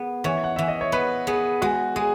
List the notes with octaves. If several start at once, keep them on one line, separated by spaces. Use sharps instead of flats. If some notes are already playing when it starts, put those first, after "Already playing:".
Already playing: B3 G#4
E3 C#5
F#5
E3 E5
D#5
C#5
B3 B4
B3 G#4
G#3 F#4
G#3 G#4